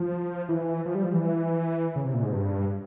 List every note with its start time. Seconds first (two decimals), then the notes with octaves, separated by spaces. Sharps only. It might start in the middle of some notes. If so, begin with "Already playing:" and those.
Already playing: F3
0.49 E3
0.85 F3
0.95 G3
1.04 F3
1.13 E3
1.96 C#3
2.05 C3
2.14 A#2
2.23 G#2
2.32 G2